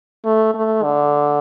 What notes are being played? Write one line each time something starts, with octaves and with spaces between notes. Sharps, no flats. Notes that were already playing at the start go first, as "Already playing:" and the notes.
A3
A3
D3